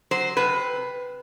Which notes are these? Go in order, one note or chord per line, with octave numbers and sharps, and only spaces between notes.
F#3 C5
C3 B4